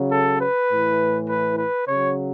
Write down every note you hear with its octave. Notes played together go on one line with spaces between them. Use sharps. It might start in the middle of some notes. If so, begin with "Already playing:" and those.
Already playing: C#3 F#3
A4
B4
A2 E3
B4
B4
C#3 F#3 C#5